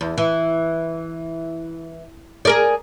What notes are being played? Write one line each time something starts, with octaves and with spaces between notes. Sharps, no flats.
E2
E3
G#4 A#4 D5